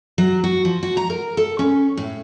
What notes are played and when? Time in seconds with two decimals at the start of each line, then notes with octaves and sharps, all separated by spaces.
0.18 F#3
0.44 F#4
0.65 F3
0.83 F#4
0.97 A#5
1.10 A#4
1.37 A4
1.59 C#4
1.97 A2